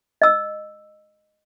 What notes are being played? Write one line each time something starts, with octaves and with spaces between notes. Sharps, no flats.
D#5 E6